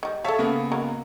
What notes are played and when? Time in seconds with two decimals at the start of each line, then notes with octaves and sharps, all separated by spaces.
0.03 D#3 G3
0.24 A4 C#5 E5 F5 A5
0.38 C#3 A#3 B3
0.72 F#3 G#3 A#4